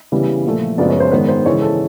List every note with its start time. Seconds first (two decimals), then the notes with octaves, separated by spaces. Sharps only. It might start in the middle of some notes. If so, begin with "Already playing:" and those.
0.12 C#3 E3 G3 B3
0.45 A#2 F3 A3
0.78 F#2 C#3 F3 G#3 B3 D5
0.90 C#5
1.00 C5
1.11 G#2 D#3 G#3 B3 B4
1.28 C5
1.45 C#3 E3 G#3 C#5
1.62 A4